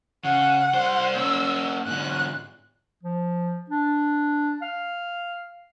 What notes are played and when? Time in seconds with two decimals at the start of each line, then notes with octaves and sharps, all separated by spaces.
0.25 C#3 F#5
0.74 C2 C5
1.15 A#3 C#4 E6
1.86 G#2 D3 F#6
3.03 F3
3.70 D4
4.62 F5